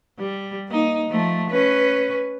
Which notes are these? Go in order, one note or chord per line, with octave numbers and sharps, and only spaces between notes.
G3
A#3 D#4
F3 A3
C#4 B4